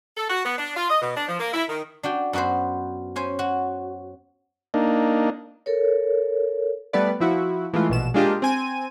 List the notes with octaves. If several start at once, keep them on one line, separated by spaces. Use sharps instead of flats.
A4
F#4
B3
D4
F4
D#5
B2
D4
F3
A#3
E4
D#3
D4 F#4 G4 G5
F#2 B3 F#4 B4 C5
C#4 C5 G#5
F#4
A#3 D4 D#4
A4 A#4 C#5
G3 A3 B3 B4 D5
F3 E4 F#4
E3 G#3 A3 F4
A#1 B2 E7
G#3 A#3 D4 F4 G4 D#5
C4 G#5 D#7